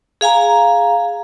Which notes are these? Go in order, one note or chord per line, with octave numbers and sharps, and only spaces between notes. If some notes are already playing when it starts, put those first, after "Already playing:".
G#4 F5 G#5 A#5